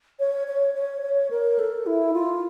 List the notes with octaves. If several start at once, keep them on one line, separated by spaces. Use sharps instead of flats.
C#5
C#5
C#5
C#5
A#4
A4
E4
F4